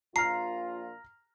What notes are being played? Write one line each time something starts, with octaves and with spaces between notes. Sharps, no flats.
A#1 A#2 F4 A#5 F6 C7